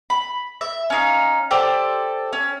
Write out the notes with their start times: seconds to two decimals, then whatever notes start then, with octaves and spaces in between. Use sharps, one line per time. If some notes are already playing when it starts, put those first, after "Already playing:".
0.10 B5
0.61 E5
0.90 C#4 D#4 F5
1.51 G4 A4 C5 D5
2.33 C#4